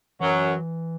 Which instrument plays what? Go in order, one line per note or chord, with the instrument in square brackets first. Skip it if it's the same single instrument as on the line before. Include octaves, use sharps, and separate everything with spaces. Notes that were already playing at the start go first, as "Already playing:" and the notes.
[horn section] F#2 F#3 [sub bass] E3